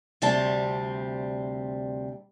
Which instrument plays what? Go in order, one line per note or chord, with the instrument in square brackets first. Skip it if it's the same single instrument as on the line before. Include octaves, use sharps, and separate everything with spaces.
[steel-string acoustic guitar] D2 C3 G3 C4 A5